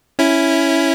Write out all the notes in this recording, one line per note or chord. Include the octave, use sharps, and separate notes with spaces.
C#4 E4